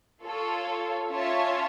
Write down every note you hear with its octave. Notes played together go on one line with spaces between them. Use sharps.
F4 A4 C#5
C#4 F4 C#5 E5 A5